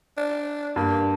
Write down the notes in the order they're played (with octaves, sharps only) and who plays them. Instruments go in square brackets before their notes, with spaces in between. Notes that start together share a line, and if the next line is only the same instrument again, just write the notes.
[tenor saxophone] D4
[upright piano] G2 [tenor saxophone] A#3